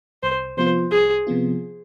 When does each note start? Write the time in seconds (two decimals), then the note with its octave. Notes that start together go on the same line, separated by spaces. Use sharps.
0.23 C2 C5
0.57 C3 F3 B3 F4 C5
0.91 C2 G#4
1.27 C3 F3 B3 F4